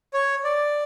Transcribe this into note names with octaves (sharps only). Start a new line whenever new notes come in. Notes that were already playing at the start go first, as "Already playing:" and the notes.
C#5
D5